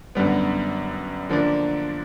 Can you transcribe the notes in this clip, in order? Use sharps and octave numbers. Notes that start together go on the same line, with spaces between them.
F#2 D3 G3 B3
D3 F3 A#3 D4